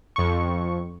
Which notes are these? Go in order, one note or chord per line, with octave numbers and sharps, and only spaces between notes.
F2 C#6